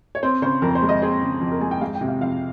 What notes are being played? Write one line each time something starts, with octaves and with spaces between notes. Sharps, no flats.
C#5
C4 C5
C#3 C5
F2 A#4
C5
G#3
D#5
C4 G#4
C#3
F2
A#4
G#3 G#5
G5
G#3 F5
G5
C3
F5
F2 F5